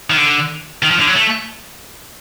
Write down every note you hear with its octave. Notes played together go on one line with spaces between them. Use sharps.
D#3
D3
D#3
F3
D3
F#3
A3